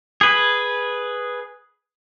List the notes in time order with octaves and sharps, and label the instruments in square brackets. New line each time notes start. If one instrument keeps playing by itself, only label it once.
[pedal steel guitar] G#4 B4